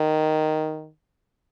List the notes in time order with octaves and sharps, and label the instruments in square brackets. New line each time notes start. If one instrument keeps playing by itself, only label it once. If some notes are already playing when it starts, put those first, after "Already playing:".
Already playing: [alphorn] D#3